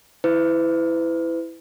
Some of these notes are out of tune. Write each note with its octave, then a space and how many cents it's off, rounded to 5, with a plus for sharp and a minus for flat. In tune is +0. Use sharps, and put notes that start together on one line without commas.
E4 +0 B4 +40